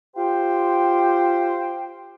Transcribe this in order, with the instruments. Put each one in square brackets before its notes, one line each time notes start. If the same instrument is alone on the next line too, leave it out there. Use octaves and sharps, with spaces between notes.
[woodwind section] F4 G4 C5 G5